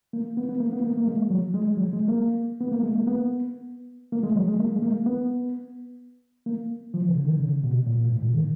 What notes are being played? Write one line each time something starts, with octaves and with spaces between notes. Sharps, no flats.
A#3
B3
B3
A#3
B3
A#3
A#3
G#3
F#3
G#3
F#3
G#3
A#3
B3
A#3
G#3
A#3
B3
A#3
G#3
F#3
G#3
A#3
G#3
A#3
B3
A#3
F3
C#3
D#3
C#3
B2
A#2
A#2
G#2
A#2
D#3